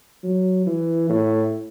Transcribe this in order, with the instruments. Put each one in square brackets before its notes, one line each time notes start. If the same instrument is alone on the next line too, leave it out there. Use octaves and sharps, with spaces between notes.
[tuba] F#3
E3
A2